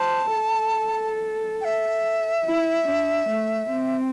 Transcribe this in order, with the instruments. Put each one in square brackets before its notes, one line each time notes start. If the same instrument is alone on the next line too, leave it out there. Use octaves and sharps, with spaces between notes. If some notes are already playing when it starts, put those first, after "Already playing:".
Already playing: [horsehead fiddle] C5 [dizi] A5
[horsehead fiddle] A4
[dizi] G5
E5
[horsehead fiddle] E4
D4
A3
C4